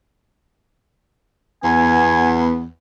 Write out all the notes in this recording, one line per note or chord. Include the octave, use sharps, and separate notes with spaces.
E2 B3 G#5